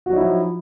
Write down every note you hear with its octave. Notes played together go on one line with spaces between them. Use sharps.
F3 F#3 D#4 E4 F#4